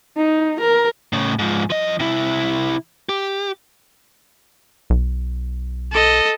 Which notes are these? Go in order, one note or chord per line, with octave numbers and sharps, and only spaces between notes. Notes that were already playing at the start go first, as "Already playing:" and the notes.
D#4
A#4
A2 C#3
G#2 F3
F3 D#5
C3 E4
G4
B1
A4 D#5